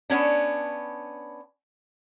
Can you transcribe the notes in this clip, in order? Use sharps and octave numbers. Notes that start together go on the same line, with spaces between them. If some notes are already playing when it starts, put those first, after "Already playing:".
B3 C#4 D4